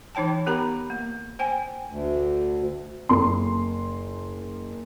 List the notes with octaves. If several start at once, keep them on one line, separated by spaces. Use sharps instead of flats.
E3 D#4 C#5 G5 A5
B3 G4 A#4 A#5 B5
A#3
C5 G5 G#5
D2
F#1 C6